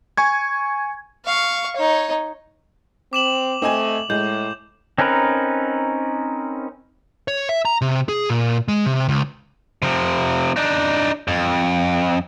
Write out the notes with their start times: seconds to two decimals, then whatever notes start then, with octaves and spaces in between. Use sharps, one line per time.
0.17 G#5 C#6 G#6
1.25 F5 C#6
1.76 D#4 C#5
3.13 C4 D6 E7 F#7
3.62 A3 C4 D#5 G#5
4.10 A2 G#3 G6
4.98 C4 C#4 D#4 A#4 B4
7.28 C#5
7.49 E5
7.65 A#5
7.81 C3
8.09 G#4
8.30 A#2
8.68 G#3
8.86 C3
9.09 C#2
9.82 C3 F3
10.56 D4 D#4
11.28 F2